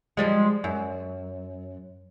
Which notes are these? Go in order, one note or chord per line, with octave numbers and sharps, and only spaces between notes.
F3 G3 G#3
F#2